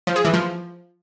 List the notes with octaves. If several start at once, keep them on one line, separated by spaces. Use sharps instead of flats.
F3
G#4
E3
F3